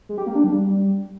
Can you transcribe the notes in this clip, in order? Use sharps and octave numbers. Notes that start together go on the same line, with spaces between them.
G#3
G4
A#3
D4
G3